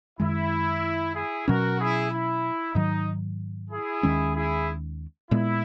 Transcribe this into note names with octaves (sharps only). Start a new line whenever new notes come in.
F#2 D#3 G#3 E4
E4 G#4
B2 F#3 C#4 F#4 A#4
E4 G#4
E4
G#2 D#3 F#3 D#4
E4 G#4
D#2 D#3 G#3 C#4
E4 G#4
A#2 G#3 B3 E4